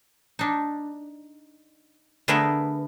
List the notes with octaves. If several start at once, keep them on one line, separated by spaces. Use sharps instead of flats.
D4 D#4
D3 A3 B3 G#4 A#4 B4